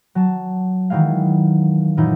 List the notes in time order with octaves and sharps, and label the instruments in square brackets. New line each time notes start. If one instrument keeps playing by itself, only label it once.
[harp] F#3 A5
D#3 E3 F#3 G#3 F5
F#2 A#2 E3 D#4